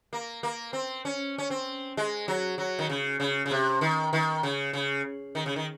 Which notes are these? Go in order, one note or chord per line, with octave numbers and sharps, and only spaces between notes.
A#3
A#3
C4
C#4
C#4
C4
G#3
F#3
F#3
D#3
C#3
C#3
C#3
C3
D#3
D#3
C#3
C#3
D#3
C#3
D#3